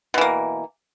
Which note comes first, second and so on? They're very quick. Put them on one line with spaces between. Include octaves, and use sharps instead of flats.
B2 E3 A#3